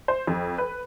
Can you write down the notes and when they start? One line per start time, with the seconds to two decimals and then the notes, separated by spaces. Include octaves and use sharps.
0.08 C5
0.27 F2
0.58 B4